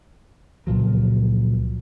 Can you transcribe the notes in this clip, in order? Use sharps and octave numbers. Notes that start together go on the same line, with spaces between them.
C#2 A#2 F3 F#3